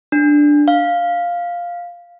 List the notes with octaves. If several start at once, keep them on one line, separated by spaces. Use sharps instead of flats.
D4
F5